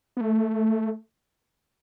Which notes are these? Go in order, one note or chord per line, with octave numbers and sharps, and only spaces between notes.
B3
A3